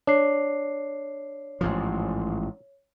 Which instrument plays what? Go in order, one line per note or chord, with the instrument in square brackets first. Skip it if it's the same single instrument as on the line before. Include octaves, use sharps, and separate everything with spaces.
[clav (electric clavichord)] D4 [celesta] C#5 C7
[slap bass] A1 G#2 F3